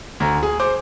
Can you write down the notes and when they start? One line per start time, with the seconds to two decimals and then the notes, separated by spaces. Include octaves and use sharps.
0.20 D2 A#5
0.43 G#4
0.60 C5 D6